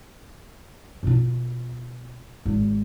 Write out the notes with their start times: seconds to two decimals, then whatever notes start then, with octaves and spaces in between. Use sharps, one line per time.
1.03 B2 F4
2.46 G#1